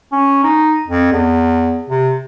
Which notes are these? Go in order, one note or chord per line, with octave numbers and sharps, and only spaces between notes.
C#4
D#4
F2
E2
C3